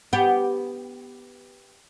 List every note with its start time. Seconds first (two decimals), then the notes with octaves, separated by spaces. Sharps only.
0.13 B3 G4